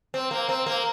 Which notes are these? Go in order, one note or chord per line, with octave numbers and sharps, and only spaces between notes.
C4
A#3
C4
A#3